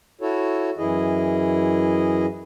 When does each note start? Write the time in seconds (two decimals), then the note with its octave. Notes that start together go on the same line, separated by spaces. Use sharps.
0.21 E4 F#4 A4 C#5
0.78 F#2 E3 E4 G#4 D#5